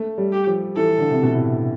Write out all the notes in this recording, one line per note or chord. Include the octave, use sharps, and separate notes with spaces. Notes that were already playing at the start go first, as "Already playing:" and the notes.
Already playing: A3
G3
G4
F3
E3 A4
D3
C3
B2
A2